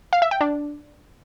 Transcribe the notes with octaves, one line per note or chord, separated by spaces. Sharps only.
F5
E5
G5
D4